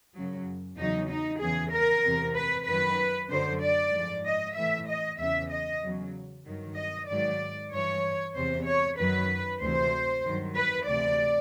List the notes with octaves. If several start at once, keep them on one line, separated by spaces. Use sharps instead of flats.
F#2 C#3 F#3
E2 C#3 F#3 D#4
D#4
E2 C#3 E3 G#4
A#4
E2 C3 E3
B4
F#2 D#3 F#3 B4
F#2 D3 F#3 C5
D5
G#2 F3
D#5
A2 E3 E5
D#5
E2 C#3 E3 E5
D#5
E2 C#3 F#3
G2 D#3 F#3
D#5
G#2 D#3 F#3 D5
G2 E3 C#5
E2 C3 E3 C5
C#5
F#2 D#3 F#3 B4
D2 C3 E3 C5
G2 D#3 F#3
B4
D2 C3 E3 D5